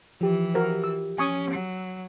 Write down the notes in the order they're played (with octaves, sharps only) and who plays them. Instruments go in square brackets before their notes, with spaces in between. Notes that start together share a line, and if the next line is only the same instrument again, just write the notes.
[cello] E3 [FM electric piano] F3 G4
[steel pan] F#4 A#4 C5
E6
[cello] C#4 [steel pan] G#5 C#6 D#6
[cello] F#3